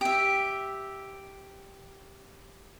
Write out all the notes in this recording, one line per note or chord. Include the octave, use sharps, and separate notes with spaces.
G4 E5